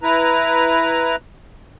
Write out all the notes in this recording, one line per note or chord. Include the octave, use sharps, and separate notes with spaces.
E4 B4 A#5